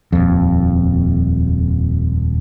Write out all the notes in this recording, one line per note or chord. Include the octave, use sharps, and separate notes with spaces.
D#1 F2